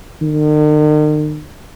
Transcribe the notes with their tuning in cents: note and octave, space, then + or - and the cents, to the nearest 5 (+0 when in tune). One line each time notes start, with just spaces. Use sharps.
D#3 -45